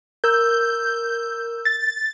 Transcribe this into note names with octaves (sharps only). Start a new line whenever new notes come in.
A#4 E6 G6
A6